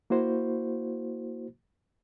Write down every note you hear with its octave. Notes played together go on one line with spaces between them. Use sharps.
A#3 E4 F#4 C5